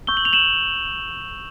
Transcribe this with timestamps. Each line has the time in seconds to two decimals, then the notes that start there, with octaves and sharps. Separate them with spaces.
0.07 C#6 E6 G6 G7
0.17 F#7
0.25 F7
0.33 E7 F#7